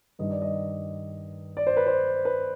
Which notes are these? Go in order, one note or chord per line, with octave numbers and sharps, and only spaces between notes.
G2 D#3 G3 D#5
D5
D#5
D5
C5
B4
C5
B4